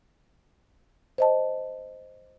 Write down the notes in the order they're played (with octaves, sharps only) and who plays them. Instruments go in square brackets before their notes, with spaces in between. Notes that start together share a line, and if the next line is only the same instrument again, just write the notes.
[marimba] C5 D#5 A5